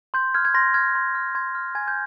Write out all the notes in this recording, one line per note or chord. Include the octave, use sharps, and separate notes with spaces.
C6 G6
F6 G#6
G#6
C6 A#6
F6 G#6
C6
F6
C6 G#6
F6
G#5 G#6
G6